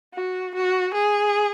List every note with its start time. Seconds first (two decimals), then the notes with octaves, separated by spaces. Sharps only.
0.14 F#4
0.55 F#4
0.94 G#4